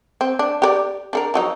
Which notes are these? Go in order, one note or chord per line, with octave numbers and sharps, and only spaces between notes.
C4
D4
G4 A#4 D5
D4 A4 A#4
F3 F#3 D#4